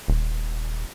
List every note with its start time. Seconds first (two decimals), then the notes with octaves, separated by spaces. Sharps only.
0.08 D#1